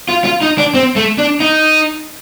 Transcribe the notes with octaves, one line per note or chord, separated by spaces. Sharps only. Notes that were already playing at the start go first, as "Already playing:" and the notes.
F4
F4
D#4
D4
C4
A3
D4
D#4